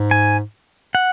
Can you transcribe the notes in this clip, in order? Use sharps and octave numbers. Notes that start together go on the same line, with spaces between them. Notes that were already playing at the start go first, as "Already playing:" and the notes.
Already playing: G#2
G#5
F#5